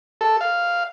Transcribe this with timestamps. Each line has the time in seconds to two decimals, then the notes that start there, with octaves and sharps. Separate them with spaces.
0.21 A4
0.41 F5